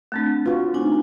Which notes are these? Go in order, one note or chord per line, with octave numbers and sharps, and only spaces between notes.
A3 C4 D4
F4 F#4 B4
A3 C4 D4 D#4 G#5